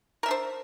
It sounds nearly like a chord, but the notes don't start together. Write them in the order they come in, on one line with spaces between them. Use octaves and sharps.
A#4 E5 D4 C5